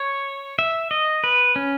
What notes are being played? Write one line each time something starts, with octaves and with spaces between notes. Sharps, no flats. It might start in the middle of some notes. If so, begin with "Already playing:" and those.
Already playing: C#5
E5
D#5
B4
C#4